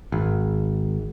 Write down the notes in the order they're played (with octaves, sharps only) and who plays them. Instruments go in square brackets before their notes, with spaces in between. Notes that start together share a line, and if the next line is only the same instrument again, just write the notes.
[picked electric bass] G#1